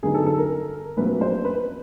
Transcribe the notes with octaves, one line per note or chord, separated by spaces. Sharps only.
G2 D3 F#3 B3 D#4 G#4
A4
A4
A#4
A#1 A#2 F#3 A3 C4 B4
C5
B4